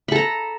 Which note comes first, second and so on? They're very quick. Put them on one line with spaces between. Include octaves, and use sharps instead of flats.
B5 A4 A#5